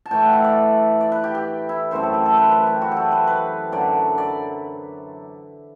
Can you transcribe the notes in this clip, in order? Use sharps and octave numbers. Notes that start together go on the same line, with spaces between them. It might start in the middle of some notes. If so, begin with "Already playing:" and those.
A5
A2 E3 A3 G5
F#5
E5
D5
D5
B4
G4
G4
E4
F#2 E3 A3 C4 C5
A4
G4
A4
B4
B4
G4
F#4
G4 A4
B4
B4
F#2 D3 F#3 D5
D5